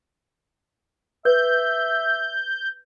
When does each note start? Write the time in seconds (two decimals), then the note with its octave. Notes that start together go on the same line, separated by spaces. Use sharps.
1.25 B4 E5 G6